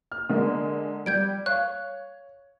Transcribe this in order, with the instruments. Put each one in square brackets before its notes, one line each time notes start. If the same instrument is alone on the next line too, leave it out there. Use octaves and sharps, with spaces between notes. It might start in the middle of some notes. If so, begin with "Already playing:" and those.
[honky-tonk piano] F6
D3 G#3 A#3
[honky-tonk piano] G3 [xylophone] G6 G#6 D7
[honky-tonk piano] C#5 [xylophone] F5 F#6